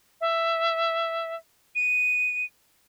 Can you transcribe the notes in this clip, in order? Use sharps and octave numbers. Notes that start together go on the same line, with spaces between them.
E5
D#7